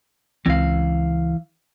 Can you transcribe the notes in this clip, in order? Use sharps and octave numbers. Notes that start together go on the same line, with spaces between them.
C#2 E3 C4 F5